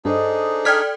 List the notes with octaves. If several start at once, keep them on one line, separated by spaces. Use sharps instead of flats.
G2 D4 D#4 G#4 A4 C5 D#5
A4 D5 G5 F6 G#6 B6